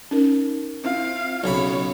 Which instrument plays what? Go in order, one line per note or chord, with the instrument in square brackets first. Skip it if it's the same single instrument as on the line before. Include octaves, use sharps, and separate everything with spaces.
[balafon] C#4 D#4 A#4
[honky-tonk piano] C4 E4 F4 [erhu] F5
[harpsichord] B1 C#3 B5 [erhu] C#5